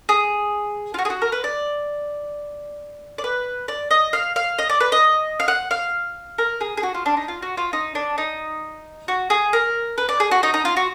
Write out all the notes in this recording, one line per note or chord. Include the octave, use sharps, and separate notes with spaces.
G#4
F4
F#4
G#4
F#4
A#4
B4
D5
D5
B4
D5
D#5
F5
F5
D#5
D5
B4
D#5
F5
F#5
F5
A#4
G#4
G#4
F#4
F4
D4
D#4
F4
F#4
F4
D#4
D4
D#4
F#4
G#4
A#4
B4
D5
G#4
F#4
D#4
D#4
F4
F#4